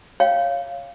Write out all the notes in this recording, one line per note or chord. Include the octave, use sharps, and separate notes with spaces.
C#5 F5 G5